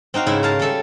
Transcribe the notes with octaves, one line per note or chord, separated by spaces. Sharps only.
C4 D#4 F#4 F5
G#2 C#3 E4 E5
A#4 F5 A5
G3 C#4 A4 E5